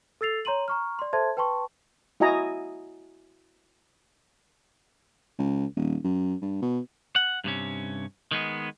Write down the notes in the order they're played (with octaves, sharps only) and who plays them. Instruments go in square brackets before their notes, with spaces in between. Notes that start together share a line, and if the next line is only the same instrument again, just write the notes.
[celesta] A4 E6 A6 C7 F7
C#5 A#5 C6 D#7 F#7
A#5 C#6 F6
D5 C6
A4 C5 E5 A5 C6 G#6
B4 G5 A5 C6 C#6
[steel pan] E4 F#4 D#5 G#5 A#5 D#6
[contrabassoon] C#2
D#1
F#2
G2
B2
[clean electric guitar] F#5
G2 C3 C#4
D#3 G#3 B3